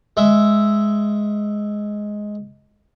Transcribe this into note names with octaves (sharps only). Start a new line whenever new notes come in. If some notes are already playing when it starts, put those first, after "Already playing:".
G#3 E5